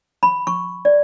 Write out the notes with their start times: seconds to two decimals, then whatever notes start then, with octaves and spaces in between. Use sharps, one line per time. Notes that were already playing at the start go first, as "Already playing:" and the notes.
0.23 B5
0.47 C#6
0.85 D5